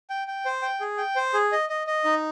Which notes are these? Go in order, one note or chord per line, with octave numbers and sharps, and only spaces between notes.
G5
G5
C5
G5
G#4
G5
C5
G#4
D#5
D#5
D#5
D#4